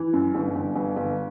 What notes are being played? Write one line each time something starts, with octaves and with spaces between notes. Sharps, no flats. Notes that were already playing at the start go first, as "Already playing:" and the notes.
Already playing: E3
F#2
G1
G1
G1
G1